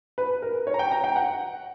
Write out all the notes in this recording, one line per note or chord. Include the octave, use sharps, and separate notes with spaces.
B4
A#4
C#5
A#5
G5
A#5
G5
F#5